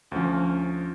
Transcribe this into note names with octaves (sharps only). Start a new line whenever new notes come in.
D2 F3 C#4